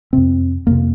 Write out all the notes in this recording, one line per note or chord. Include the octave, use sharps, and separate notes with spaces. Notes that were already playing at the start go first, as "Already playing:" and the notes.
F2 C3 C4
F2 C3 A#3